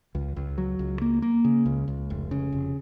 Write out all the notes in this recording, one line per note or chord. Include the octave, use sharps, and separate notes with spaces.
C#2
C#2
F#3
C#2
A#3
A#3
C#3
C#2
C#2
F1
C#3
F1